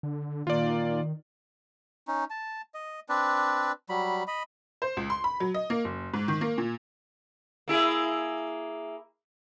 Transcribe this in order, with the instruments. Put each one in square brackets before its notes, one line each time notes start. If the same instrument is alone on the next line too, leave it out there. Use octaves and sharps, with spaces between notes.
[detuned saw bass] D3
[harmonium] A#2 A#3 [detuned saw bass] D#3 [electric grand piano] F4 D5
[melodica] C#4 D#4
A5
D#5
C4 D4 B4 D5
F#3 G3 B5
D#5 B5
[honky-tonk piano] C5
C#2
C6
B5
F#3
D#5
A#3
F#1
G#2
D#3
A#3
A#2
[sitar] A#3 E4 G#4